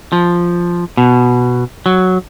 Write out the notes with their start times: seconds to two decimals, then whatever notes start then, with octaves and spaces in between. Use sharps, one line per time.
0.12 F3
0.97 B2
1.86 F#3